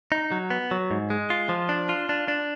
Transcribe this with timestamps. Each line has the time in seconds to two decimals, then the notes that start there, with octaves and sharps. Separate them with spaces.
0.12 D#4
0.32 F#3
0.50 B3
0.71 F#3
0.91 G#2
1.10 G#3
1.30 F4
1.49 F3
1.69 D4
1.89 F4
2.09 D4
2.28 D4